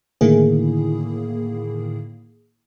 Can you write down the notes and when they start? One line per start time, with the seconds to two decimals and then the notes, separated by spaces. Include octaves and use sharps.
0.21 A2 D3 D#3 A#3 E4 G#4